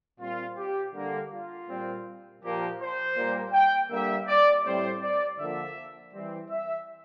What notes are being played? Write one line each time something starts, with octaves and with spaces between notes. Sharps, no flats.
A#2 G3 C4 F4
G4
D3 G3 A#3
F4
A#2 G3 C4
A#2 F3 A#3 G4
C5
A#2 G3 A#3
G5
D3 G3 A#3 E5
D5
A2 G3 C4 C5
D5
D3 F3 A#3 E5
E3 G3 C4
E5